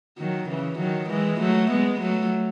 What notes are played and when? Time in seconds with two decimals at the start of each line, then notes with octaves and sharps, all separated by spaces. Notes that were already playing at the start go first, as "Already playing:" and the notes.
0.18 D#3 F#3
0.49 C#3 E3
0.79 D#3 F#3
1.09 E3 G#3
1.40 F#3 A3
1.71 G#3 B3
2.00 F#3 A3